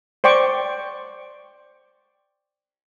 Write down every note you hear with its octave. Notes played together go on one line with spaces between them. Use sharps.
C5 D5 G5 C#6 D6